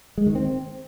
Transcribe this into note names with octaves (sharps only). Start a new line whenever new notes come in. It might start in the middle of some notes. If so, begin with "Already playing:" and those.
G#3
D#3
C4